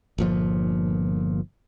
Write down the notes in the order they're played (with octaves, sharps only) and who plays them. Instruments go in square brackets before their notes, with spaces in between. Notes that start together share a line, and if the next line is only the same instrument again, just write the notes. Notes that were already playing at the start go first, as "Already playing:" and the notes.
[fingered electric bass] G1 A#2 F3